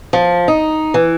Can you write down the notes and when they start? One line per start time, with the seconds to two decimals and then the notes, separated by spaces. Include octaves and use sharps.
0.13 F3
0.48 D#4
0.94 E3